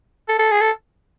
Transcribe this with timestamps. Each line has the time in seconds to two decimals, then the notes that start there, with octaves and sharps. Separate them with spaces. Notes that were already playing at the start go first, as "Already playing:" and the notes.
0.29 A4
0.39 A4
0.51 G#4
0.61 A4